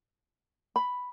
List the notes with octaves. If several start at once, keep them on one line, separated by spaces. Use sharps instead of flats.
B5